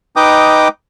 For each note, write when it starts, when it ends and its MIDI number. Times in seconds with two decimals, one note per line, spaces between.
0.16 0.68 63
0.16 0.68 71
0.16 0.68 75
0.16 0.68 79
0.16 0.68 86
0.16 0.68 87